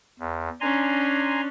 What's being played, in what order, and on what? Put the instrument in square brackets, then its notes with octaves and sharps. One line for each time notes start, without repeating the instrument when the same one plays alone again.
[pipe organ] E2
[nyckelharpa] C#4 D4 [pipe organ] G#5 A#5 C6